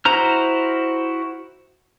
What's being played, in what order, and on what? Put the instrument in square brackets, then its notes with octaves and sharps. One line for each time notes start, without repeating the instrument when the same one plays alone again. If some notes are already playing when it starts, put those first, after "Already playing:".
[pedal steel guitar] E4 F#4 C5 A#5 F6